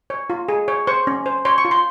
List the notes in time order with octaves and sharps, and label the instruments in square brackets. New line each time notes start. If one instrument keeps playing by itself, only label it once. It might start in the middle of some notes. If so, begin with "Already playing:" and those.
[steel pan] C#5
F4
G#4
C#5
C5 C#6
C#4
C5
C#5 C6
C#6
F4
C6